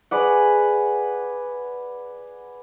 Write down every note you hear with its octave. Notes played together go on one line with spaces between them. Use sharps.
G#4 B4 D5 F#5